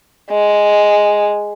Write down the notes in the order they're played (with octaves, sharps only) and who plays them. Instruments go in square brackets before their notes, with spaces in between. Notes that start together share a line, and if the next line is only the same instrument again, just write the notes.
[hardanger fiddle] G#3